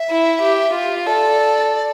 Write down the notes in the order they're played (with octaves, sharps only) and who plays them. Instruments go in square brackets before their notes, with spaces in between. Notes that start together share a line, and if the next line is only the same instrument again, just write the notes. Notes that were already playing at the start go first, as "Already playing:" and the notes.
Already playing: [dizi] E5
[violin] E4
G4
F4
[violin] A4 [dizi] D5